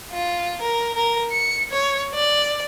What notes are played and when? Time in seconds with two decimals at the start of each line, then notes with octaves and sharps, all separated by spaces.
0.12 F4
0.62 A#4
0.95 A#4
1.32 C#7
1.71 C#5
2.14 D5